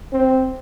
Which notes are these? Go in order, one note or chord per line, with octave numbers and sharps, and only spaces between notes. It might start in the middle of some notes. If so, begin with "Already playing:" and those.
C4